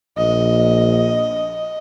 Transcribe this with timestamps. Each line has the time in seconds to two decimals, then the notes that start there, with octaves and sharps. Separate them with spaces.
0.18 A#1 D#5